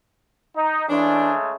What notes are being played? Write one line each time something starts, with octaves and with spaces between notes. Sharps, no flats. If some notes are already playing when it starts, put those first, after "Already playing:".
D#4
C#3 E3 G#3 A3 D4